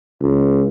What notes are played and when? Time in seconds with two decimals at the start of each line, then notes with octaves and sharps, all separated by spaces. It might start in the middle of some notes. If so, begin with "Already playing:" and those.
0.21 C#2